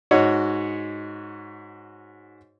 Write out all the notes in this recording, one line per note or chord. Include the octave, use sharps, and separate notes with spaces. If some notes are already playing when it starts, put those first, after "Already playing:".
G#2 F#4 C#5 D#5